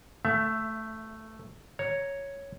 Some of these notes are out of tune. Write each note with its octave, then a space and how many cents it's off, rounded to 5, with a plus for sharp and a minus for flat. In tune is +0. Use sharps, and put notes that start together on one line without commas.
A3 +0 E5 +25
C#5 +0 A#5 +0